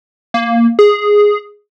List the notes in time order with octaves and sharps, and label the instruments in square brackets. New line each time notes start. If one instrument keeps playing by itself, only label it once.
[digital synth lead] A#3
G#4